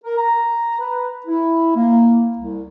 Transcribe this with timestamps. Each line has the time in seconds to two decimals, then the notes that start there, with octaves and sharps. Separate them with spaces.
0.04 A#4
0.17 A#5
0.80 B4
1.27 E4
1.77 A#3
2.38 C2